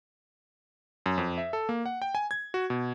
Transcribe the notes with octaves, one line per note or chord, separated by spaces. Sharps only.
F#2
F2
E5
A4
A#3
F#5
G5
G#5
G#6
F#4
B2